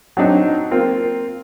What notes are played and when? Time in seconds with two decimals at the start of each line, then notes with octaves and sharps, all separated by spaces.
0.17 F#3 C4 D4 D#4
0.71 A#3 C4 F4